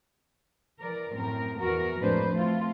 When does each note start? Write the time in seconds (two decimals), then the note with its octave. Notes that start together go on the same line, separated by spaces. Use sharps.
0.79 E3 A#4 D5
1.13 F#2 A2 C4 A#4
1.59 E2 E3 B3 F#4 A#4
1.99 F2 A2 G#3 D4 B4 C5
2.32 A3 C4 F4